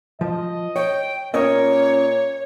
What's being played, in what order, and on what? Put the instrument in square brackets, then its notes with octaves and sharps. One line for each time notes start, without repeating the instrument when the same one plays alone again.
[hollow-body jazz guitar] F3 [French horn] D#5
[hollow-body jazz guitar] C#5 [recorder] G5
[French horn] A#2 [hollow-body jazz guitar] C#4 A#4 D#5 [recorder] C#5